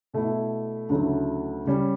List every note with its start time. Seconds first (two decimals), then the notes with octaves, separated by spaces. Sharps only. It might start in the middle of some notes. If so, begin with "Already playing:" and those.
0.14 B2 A3 E4
0.89 D2 C#3 F#3 A3 E4
1.65 C#3 G3 C#4